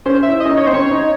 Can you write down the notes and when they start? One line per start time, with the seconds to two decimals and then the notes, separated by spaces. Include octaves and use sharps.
0.05 C#4 C5
0.23 E5
0.28 E4
0.40 D#5
0.46 C#4
0.51 D#4
0.57 C#5
0.66 C4 C5
0.74 C#4 C#5
0.91 D#4